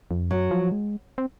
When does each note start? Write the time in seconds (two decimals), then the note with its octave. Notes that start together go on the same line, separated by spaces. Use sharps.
0.11 F2
0.31 F#2 F#3
0.51 F3
0.72 G#3
1.18 C4